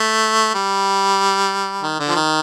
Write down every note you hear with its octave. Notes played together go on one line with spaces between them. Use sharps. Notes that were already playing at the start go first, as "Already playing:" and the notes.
Already playing: A3
G3
D#3
D3
F3
D#3